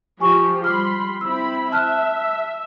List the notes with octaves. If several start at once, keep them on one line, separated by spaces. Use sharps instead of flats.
F3 G4 G#5 C#6
G3 B5 C6 D6 F6
C4 E4 B5 E6
E5 A5 F6 F#6